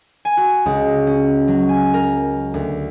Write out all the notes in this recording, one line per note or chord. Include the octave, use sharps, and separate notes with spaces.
G#5
F#4
C#2
C#4
F#3
G#5
A#4
D2